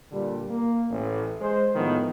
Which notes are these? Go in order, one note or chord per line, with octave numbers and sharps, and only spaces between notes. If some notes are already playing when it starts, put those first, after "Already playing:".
A#2 D3 G3
A#3
A1
G#3 C5
A2 D#3 F3 G#3 B3